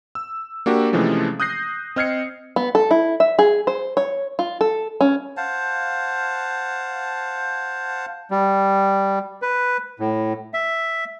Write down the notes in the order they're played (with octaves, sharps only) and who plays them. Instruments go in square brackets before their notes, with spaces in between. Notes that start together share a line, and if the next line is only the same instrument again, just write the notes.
[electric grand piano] E6
A#3 D4 F#4 G4
C3 E3 F3 G#3 A3 C#4
D#6 F#6 G6 A#6 C7
C4 D#5 F6 G#6 C7 C#7
[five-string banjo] B3
A4
E4
E5
G#4
C5
C#5
F4
A4
C#4
[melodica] C5 F5 F#5 A5
[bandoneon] G3
B4
A2
E5